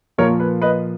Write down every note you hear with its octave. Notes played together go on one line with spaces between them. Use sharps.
A#2 F3 A#3 A#4 C#5
B4
B4 D#5